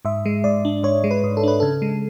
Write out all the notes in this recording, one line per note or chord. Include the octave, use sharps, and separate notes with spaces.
G#2 E5
G#3
G#2 D5
D4
G#2 C#5
G#3
B4
G#2
A4
D4 B4
C#3 A4
G#3